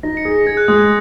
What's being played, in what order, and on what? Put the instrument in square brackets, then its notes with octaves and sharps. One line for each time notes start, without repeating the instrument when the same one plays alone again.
[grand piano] D#4 [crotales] A#6
[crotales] C#7
[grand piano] G#4
[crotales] A#6
[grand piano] G#4 [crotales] G#6
[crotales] F#6
[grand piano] G#3 [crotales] D#6